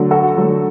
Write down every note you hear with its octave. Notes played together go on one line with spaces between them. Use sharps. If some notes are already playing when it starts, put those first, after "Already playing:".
Already playing: D3 F#3 A3
F#4 A4
D3 F#3 A3